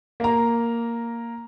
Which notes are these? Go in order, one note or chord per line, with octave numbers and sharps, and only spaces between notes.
A#3 A#5